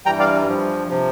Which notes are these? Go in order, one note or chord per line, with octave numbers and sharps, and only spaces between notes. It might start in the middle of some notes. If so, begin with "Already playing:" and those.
G2 E3 G3 G5 A#5
D5 F5
G2 F3
C3 F3